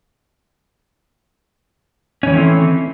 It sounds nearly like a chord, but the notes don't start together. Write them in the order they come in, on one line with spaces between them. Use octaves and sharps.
C#4 E3 D#3 A3 C4